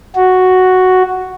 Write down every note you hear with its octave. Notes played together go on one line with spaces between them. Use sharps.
F#4